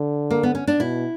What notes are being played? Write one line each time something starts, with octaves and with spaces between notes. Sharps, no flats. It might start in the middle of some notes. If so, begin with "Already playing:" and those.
Already playing: D3
A#3
B3
C#4
D4
B2 E4